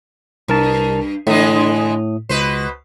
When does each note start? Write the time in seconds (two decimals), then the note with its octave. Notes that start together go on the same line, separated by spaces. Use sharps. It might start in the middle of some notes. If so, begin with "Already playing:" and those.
0.48 C2 G2 A#4 A5
1.27 A2 D3 E3 G#3 D#6
2.29 C#2 B2 B4 C5